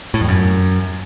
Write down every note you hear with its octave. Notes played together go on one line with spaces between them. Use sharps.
A2
F2
F#2